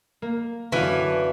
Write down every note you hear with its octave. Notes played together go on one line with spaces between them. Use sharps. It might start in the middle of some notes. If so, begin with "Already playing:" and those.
A#3
F#2 D3 E3 C#4 F#4 F5